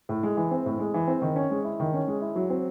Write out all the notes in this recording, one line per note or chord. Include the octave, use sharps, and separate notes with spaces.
A2
G#3
E3
C4
A2
G#3
E3
C4
D#3
C#4
G#3
E4
D#3
C#4
G#3
E4
F#3
C4